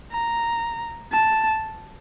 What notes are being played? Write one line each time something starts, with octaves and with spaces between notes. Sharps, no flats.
A#5
A5